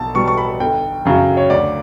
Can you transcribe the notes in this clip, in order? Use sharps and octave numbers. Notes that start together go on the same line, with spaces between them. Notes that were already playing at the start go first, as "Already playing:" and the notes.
Already playing: B1 A5
B2 G3 C#6
C#6
B5
G1 G5
F#2 C#3 F#3
C#5
D2 D5